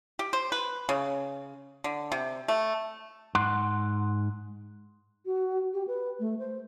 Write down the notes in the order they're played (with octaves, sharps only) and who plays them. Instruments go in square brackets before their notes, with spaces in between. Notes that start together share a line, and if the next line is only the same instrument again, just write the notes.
[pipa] G4
C5
B4
C#3
D3
C3
A3
[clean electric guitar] G#2 F#5 C6
[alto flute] F#4
G4
B4
A3
C5